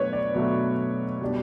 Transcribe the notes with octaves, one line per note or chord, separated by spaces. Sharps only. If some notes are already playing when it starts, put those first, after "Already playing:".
Already playing: B2 F#3 A3 D4 B4 C#5
D5
B2 F#3 A3 D4
B2 G3 D4